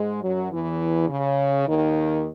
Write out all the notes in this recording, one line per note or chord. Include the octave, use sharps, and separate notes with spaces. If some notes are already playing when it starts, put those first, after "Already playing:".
Already playing: G#2 G#3
F#2 F#3
E2 E3
C#3
D#2 D#3